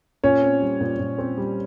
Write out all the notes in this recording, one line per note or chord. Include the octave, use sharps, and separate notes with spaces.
A#2 C#4 C#5
C4
G3
A#2
A#2
C4
G3